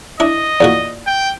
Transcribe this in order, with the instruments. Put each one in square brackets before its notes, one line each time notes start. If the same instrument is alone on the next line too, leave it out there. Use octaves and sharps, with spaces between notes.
[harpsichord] D4 E4 [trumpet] D#5
[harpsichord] E2 A#2 F#4 [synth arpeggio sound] D5
[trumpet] G5